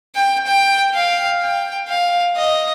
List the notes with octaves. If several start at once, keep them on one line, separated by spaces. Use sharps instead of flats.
G5
G5
F5
G5
F5
D#5